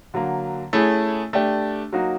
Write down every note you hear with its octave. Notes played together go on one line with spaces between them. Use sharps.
D3 F#3 A#3
A3 C#4 E4 G#4
A3 D4 G4
F#3 A#3 D#4 F#4